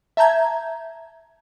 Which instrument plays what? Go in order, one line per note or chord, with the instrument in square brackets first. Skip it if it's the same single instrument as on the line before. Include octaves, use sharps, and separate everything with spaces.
[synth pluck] E5 A5 A#5 G6 G#6